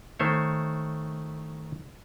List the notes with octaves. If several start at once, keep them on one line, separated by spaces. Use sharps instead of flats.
D#3 A3 C5 C#5